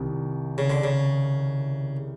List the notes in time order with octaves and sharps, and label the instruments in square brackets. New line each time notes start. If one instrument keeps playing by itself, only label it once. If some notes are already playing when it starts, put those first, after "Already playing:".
Already playing: [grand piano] C2 C3 D#3
[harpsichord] C#3
D3
C#3